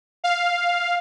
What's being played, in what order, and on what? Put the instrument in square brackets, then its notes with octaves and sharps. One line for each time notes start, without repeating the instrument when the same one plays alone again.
[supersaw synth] F5